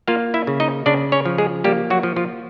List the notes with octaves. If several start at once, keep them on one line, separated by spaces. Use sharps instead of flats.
A#3 F4 F5
E4 E5
C#3
D#4 D#5
C#3 D4 D5
C#4 C#5
F3
G#3 G#4
G3 A#3 G4
F#3 F#4
F3
F3 F4